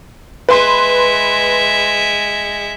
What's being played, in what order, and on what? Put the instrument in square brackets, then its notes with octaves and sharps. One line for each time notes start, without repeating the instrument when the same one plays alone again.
[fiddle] G#3 E5 [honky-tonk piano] B4 C6